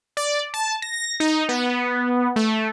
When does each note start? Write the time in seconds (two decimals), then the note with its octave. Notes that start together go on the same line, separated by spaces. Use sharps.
0.17 D5
0.54 A5
0.82 A#6
1.20 D#4
1.49 B3
2.36 A3